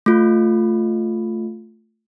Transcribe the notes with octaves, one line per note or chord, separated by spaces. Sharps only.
A3 F4